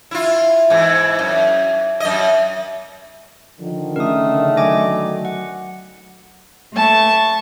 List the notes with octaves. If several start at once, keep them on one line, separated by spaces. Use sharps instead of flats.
E4 F4
G#2 E3
F#2
F#2 D#5
D3 D#3 F3
C#3 A3 A#4 D#6
F#3 D#5 G#5 D6
F#5
A3 A5 C#6